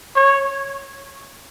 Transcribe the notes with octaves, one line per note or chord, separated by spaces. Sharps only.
C#5